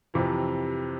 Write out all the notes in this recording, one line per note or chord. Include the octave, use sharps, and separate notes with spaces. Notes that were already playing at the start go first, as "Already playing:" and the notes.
F2 C3 E3